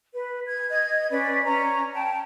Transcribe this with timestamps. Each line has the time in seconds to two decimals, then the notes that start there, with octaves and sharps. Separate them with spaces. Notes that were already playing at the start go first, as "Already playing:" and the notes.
0.13 B4
0.47 G#6
0.70 D#5 G#6
1.11 C#4 B4 D5
1.44 C#4 A#5
1.94 G5 A5